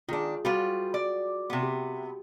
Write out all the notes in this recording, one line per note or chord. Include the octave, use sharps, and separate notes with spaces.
D#3 D4 F4 G#4
G3 F4 F#4 B4
D5
C3 B3
G4